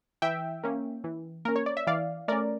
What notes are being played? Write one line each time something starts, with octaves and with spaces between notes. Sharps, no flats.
E3 E5 G5
A#3 C#4
E3
A#3 C#4 A#4
C#5
D5
E5
E3 D5 F5
A3 C#4 A#4 D5